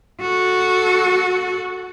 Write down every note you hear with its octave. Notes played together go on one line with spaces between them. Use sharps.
F#4 A4